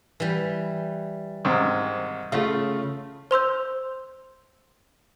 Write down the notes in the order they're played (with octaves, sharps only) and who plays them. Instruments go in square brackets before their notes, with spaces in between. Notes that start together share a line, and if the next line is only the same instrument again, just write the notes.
[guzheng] E3 G3
[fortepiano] G#2 C3 D#3
[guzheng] C#3 [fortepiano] A3 F4 F5
[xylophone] C5 C6 E6 G6